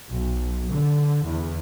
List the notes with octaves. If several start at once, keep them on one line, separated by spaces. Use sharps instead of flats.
B1
D3
E2